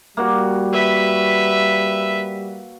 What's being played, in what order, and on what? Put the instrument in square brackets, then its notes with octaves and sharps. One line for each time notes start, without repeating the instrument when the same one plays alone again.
[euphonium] G3 [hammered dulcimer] A#3 F#4
[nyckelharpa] B4 E5